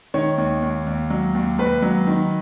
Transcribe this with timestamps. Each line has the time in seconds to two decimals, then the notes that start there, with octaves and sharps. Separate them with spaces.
0.14 D#3 C#5
0.38 D#2
0.62 D#2
0.87 D#2
1.10 F#3
1.35 D#2
1.58 D#2 B4
1.82 F#3
2.07 D#3